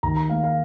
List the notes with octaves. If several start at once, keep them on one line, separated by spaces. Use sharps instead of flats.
D#2 A#5
A#5
A#3 F5
F5